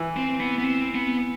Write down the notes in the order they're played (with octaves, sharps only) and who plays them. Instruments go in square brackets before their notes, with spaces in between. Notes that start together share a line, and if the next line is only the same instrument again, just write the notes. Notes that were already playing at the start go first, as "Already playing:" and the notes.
Already playing: [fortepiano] E3
[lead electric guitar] C4
B3
B3
C4
B3